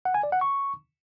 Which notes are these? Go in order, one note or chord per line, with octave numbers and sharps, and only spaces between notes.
F#5
G#5
D5
F#5
C#6